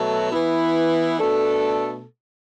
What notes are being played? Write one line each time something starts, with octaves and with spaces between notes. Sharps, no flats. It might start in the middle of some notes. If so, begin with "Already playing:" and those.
Already playing: B2 F#3 A3 F#4 A4
E3 B3 E4
B2 A3 D4 A4